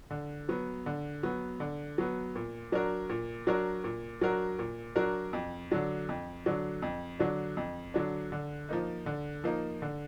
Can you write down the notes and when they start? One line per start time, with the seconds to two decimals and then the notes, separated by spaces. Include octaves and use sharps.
0.10 D3
0.49 F#3 B3
0.86 D3
1.23 F#3 B3
1.60 D3
1.98 F#3 B3
2.35 A#2
2.72 F#3 D4 F#4 A#4
3.09 A#2
3.47 F#3 D4 F#4 A#4
3.84 A#2
4.21 F#3 D4 F#4 A#4
4.59 A#2
4.96 F#3 D4 F#4 A#4
5.33 F2
5.71 D3 F#3 D4
6.09 F2
6.46 D3 F#3 D4
6.82 F2
7.19 D3 F#3 D4
7.57 F2
7.94 D3 F#3 D4
8.32 D3
8.69 F3 A#3 D#4
9.06 D3
9.44 F3 A#3 D#4
9.82 D3